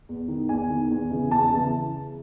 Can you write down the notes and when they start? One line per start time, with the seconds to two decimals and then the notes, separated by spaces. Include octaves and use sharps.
0.09 E2
0.28 D#3
0.49 E2 G#5
0.70 D#3
0.90 E2
1.10 C#3 E3
1.31 E2 A5
1.51 C#3 E3